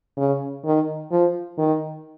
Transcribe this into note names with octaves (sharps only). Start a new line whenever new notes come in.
C#3
D#3
F3
D#3